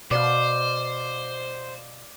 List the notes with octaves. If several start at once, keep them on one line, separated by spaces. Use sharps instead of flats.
B2 C5 D5 F5